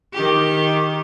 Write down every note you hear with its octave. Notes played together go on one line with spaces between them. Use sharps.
D#3 G4